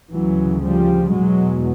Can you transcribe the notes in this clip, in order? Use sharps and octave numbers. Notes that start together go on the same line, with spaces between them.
D2 C#3 E3 F#3
F3 G3
E2 B2 F#3 G#3